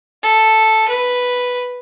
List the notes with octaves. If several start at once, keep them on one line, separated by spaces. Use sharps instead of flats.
A4
B4